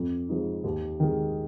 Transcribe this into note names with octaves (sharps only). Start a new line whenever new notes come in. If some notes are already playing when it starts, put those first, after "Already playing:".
Already playing: F2
F3 G#3 D#4
D#2
D#3 G#3